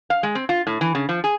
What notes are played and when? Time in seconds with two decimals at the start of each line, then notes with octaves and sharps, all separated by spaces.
0.10 F5
0.23 G#3
0.35 C4
0.49 F4
0.67 A2
0.81 E3
0.95 C#3
1.09 F3
1.24 G#4